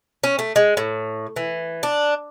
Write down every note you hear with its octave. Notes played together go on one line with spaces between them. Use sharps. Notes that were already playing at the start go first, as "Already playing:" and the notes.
C#4
A3
G#3
A2
E3
D4